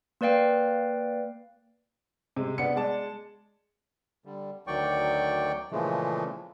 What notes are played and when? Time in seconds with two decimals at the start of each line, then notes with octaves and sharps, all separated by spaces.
0.21 A#3 B4 D5 F5 G5
2.36 C3 G#3
2.58 B3 D4 C#7
2.76 G#3 D5 A5
4.25 D3 G3
4.67 D2 D#3 F#3 D5 G5 C#6
5.72 A#2 C#3 E3 F3 G#3 A3